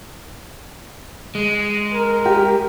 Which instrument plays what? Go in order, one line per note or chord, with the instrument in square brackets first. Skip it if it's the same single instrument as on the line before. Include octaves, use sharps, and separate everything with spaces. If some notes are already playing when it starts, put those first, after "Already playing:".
[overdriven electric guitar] G#3
[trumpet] A#4
[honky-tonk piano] G4